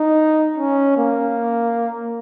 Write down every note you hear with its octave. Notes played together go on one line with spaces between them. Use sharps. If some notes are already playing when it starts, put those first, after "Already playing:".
Already playing: D#4
C#4
A#3